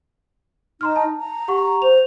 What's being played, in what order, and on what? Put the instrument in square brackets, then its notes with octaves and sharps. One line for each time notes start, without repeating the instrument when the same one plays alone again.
[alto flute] D#4 [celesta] A#5 C6 F6
[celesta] A5
[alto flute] A#5
[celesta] G4 F#5 C#6
[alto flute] C5 [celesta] F7